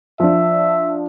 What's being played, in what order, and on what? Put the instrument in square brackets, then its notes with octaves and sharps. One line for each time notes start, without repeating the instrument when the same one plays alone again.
[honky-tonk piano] F3 D4 [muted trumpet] E5